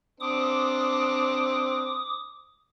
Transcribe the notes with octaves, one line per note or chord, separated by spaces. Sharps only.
C4 D4 D6 D#6